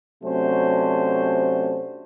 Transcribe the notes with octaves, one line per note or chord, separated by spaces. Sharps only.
C3 F#3 A3 C#4 D4 C5